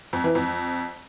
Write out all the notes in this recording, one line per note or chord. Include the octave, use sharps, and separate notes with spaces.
F2
E3
F2